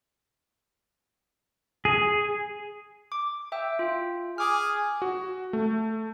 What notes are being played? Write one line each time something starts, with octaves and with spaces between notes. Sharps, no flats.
G#4
D6
E5 G5 E6
F4
G#4 D6 F6
F#4
A3